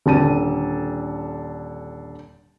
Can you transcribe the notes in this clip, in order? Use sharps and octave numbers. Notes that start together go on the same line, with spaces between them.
D#1 D3 A5 D#7